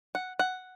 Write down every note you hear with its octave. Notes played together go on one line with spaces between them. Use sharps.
F#5
F#5